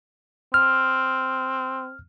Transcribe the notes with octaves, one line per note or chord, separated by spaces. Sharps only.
C4 F6